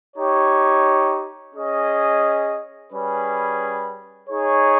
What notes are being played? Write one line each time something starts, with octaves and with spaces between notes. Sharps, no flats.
D#4 G4 C#5
C#4 G#4 D#5
G3 C#4 G#4 B4
D#4 G#4 C#5